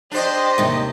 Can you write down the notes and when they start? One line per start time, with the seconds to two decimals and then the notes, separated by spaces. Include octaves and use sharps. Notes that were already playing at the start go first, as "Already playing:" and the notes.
0.11 D4 G4 C5 D#5
0.58 D#2 C3